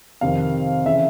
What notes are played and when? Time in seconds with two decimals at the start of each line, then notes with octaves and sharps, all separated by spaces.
0.21 F2 C3 D#3 F5
0.86 C#3 E3 E5